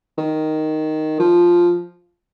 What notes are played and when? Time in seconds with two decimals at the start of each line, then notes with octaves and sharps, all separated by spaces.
0.18 D#3
1.19 F3